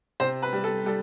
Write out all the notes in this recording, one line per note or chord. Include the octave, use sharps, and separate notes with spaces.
C3 C5
B4
G3
A4
G3 A4